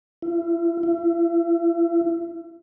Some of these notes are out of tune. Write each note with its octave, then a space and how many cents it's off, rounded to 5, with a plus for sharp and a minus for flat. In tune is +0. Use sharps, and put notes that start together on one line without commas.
E4 +45
E4 +40